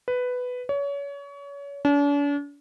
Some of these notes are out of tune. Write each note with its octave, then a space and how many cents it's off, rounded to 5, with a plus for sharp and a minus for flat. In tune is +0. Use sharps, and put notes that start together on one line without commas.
B4 +10
C#5 +30
D4 -45